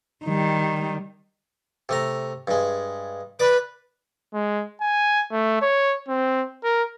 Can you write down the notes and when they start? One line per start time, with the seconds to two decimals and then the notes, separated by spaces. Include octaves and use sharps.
0.25 D#3 G3
1.89 C3 A3 A#5
2.47 G2 G#3
3.40 B4 D5 D6
4.34 G#3
4.81 G#5
5.32 A3
5.62 C#5
6.09 C4
6.64 A#4